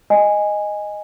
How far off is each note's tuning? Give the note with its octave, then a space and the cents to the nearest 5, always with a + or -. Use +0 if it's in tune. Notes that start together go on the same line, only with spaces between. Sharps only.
D#5 -5 G#5 -5